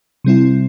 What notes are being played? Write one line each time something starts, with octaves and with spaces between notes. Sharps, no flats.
C3 G3 C4 E4